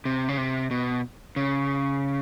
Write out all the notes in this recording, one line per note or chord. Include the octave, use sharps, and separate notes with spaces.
C3
C#3
C3
B2
C#3